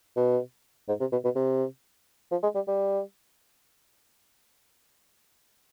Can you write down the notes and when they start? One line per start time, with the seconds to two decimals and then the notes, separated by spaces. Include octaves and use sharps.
0.16 B2
0.89 G#2
1.00 C3
1.12 B2
1.24 B2
1.36 C3
2.32 F3
2.43 G#3
2.55 G3
2.68 G3